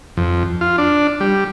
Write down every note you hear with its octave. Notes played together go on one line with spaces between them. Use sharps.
F2
F4
D4
G3